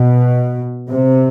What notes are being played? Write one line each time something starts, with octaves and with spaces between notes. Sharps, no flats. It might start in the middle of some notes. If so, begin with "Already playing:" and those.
Already playing: B2
C3